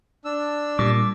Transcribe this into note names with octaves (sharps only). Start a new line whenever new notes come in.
D4 E6
A#2 G3 D6